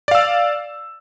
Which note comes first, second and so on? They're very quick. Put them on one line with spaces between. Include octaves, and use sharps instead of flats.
D5 F5 E6